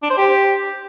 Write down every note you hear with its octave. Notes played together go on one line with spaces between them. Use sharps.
D4
C5
G4